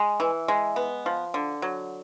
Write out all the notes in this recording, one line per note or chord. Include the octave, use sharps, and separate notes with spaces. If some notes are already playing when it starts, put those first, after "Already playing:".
Already playing: G#3
E3
G#3
B3
F3
D3
F#3